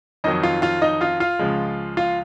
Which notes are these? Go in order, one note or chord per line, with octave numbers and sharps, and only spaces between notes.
F2 D#3 F#3 D#4 D#5
F4 F5
F4 F5
D#4 D#5
F4 F5
F4 F5
C#2 C#3 F3 G#3
F4 F5